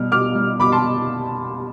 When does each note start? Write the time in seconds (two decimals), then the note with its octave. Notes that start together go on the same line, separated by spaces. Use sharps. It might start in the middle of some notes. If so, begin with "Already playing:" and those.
Already playing: B2 G3 F6
0.11 B2 D6 F6
0.35 G3
0.60 B2 B5 D6
0.72 A5 C6